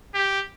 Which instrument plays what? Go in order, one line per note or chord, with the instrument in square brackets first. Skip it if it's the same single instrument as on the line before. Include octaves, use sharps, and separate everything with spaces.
[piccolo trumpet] G4